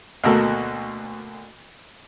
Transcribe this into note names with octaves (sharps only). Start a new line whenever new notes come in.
D2 B2 A#3 F#4 A4